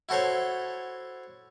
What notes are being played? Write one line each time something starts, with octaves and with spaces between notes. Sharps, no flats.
E4 F#4 A4 C5 C#5